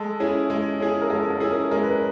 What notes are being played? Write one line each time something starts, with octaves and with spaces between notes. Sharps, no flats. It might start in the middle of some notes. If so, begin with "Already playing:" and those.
Already playing: G#3 A4
C#4 E4 G#4
G#3
C#4 E4 G#4
A#4
G#3 A4
A4
C#4 E4 G#4
A#4
G#3 A#4
B4
A#4